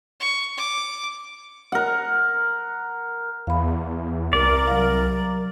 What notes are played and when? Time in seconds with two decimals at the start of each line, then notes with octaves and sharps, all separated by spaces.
0.20 C#6
0.57 D6
1.72 A#4 F#5
3.47 E2 F5 B5
4.33 C2 A#4 D5
4.67 F#3 F5